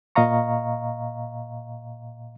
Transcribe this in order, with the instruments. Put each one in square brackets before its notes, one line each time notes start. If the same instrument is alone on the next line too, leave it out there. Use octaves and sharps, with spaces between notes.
[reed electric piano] A#2 D#5 F5 A#5 C#6